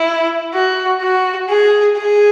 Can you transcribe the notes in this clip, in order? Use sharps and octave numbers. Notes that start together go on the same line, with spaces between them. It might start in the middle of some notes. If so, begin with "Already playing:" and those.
Already playing: E4
F#4
F#4
G#4
G#4